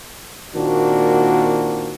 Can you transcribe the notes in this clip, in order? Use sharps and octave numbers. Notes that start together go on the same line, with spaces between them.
A#2 D#3 A#3 C4 D4 F#4